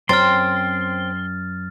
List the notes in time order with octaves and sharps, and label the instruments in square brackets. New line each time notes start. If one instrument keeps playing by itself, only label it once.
[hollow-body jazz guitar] F#2 [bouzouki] C4 [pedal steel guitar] C6 [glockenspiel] F6 A6